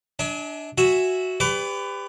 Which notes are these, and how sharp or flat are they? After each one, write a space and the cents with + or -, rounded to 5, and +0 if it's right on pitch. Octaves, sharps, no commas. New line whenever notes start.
D4 +0 E5 -45 G#5 +30
F#4 +0 E5 +0 G#5 -5
G4 +25 B4 +30 D5 -30